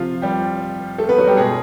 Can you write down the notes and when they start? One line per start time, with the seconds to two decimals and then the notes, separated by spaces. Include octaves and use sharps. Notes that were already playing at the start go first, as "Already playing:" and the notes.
Already playing: C3 F3 F4
0.22 G3 G4
0.98 A3 A4
1.08 B3 B4
1.18 F#3 F#4
1.27 G3 G4
1.37 B2 G#3 G#4